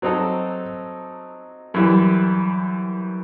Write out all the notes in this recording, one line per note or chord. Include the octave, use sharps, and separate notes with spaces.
F#3 C4 D#4 A4
F#2 E3 G3